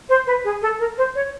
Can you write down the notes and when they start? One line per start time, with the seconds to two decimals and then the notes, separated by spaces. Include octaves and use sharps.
0.09 C5
0.27 B4
0.44 G#4
0.62 A4
0.79 A#4
0.98 C5
1.15 C#5